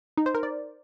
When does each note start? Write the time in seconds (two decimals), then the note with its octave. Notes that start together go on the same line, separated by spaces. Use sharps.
0.18 D#4
0.26 C5
0.35 A#4
0.43 D5